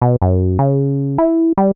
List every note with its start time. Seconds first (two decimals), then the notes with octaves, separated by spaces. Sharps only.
0.02 B2
0.22 F#2
0.59 C#3
1.18 E4
1.57 G3